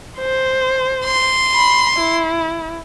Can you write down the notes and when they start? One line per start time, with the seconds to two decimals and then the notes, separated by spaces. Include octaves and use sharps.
0.18 C5
1.05 C6
1.55 B5
1.97 E4